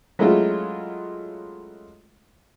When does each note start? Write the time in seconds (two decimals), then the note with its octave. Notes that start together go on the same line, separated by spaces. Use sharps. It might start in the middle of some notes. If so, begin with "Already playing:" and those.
0.19 F#3 G#3 A3 C#4 E4 F4